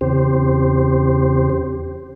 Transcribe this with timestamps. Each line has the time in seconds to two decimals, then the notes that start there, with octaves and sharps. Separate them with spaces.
0.01 E2 C#3 C4 G4 C5